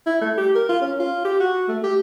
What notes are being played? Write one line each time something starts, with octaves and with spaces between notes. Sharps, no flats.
E4
A3
G4
A#4
F4
C#4
F4
G4
F#4
A3
G4